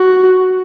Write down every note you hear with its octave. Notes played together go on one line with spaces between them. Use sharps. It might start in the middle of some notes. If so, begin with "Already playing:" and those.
Already playing: F#4